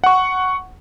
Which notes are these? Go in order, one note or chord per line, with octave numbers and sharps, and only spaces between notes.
F#5 C#6